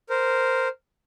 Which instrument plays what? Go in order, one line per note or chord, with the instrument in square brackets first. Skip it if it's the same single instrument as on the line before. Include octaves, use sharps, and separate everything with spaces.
[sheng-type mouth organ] A#4 C5